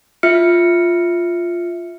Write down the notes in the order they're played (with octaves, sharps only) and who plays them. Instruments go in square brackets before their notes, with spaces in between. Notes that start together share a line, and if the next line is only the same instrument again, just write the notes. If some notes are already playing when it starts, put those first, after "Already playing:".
[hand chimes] F4 E5 F6 C#7